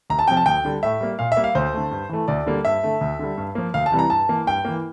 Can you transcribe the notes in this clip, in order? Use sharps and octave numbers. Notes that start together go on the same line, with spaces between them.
D2 A#5
A5
C3 F3 G5
A5
D2 G5
D3 G3
A2 E5
G3 A#3
A#2 F5
E5
G3 A#3
F5
D2 C5
D3 A3
G2
E3 A3
D2 D5
D3 G3 A#3
G2 E5
D3 A3
D2
D3 G3
G2
F3 A#3
D2 F5
A5
C3 E3 G3
A#5
G2 A5
E3 A#3
G2 G5
E3 A#3